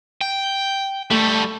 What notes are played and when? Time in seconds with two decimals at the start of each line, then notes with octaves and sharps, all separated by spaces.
0.21 G5
1.11 G3 A3 A4